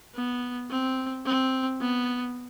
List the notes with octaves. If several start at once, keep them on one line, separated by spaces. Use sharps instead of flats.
B3
C4
C4
B3